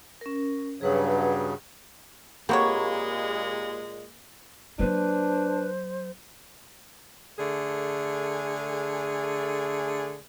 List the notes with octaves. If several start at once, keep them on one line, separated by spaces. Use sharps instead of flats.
C#4 A#4
G2 C#3 F#3 G#4 B4 F#5
A#2 G#3 A#3 C4 F#4 G4 C#5 B5
F#3 A#3 D4 B4 C5
D3 A3 G#4